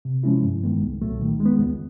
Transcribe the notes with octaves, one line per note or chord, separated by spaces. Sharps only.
C3
F3 G#3 C#4 E4
G2
D#3 G#3 B3
C2
A#2 F#3 A3
D#3
G#3
B3
C#2